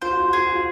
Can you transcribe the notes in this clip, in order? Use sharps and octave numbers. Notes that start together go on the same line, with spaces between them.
F4 C5
F#4
F4
F#4
F4 G#4
F#4
F4